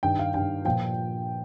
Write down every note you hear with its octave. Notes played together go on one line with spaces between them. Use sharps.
G2 D#3 G5
F5
G2 D#3 G5
A#2 F3 G5